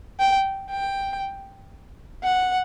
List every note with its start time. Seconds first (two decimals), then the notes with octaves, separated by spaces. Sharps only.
0.20 G5
0.71 G5
2.24 F#5